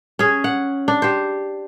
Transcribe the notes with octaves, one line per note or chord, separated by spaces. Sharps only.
C#4 G#4
F#5
D4
G4 C5